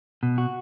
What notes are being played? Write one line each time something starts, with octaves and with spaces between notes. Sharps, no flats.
B2
F#4